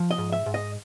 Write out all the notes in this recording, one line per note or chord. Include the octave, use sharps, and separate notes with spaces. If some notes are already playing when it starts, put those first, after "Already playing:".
Already playing: F3
D#5
G#2
E5
G#2
D#5